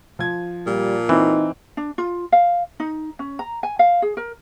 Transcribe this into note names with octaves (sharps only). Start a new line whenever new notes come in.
F3 G#6
A#2 G3
E3 C4 D#4
D4
F4
F5
D#4
C#4
A#5
G#5
F5
G#4
A#4